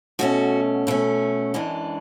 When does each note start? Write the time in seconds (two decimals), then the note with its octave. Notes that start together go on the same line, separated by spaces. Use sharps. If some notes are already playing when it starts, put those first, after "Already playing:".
0.19 B2 A3 C#4 F#4
0.87 B2 A3 C#4
1.54 F#2 E3 G#3 D4